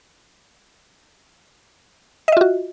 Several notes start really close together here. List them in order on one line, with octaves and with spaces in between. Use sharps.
D#5 E5 F4 F#4